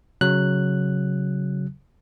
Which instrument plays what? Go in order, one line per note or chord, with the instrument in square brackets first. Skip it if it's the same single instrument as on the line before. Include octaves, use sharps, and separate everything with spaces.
[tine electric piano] C#3 F#3 F#6